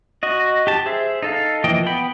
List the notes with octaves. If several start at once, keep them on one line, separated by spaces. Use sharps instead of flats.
F#4 D#5
G4 A5
G#4 C5 E5
D#4 A4 F5
E3 F3 A#3 D#5 G5
B3 G5 B5